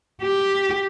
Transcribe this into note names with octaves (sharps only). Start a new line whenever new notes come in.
G4